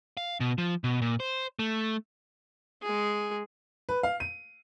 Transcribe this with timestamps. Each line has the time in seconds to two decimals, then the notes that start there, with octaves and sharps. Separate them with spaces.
0.17 F5
0.40 B2
0.58 F3
0.84 B2
1.02 A#2
1.20 C5
1.59 A3
2.82 G#3 G#4
3.89 B4
4.03 F5
4.20 D#7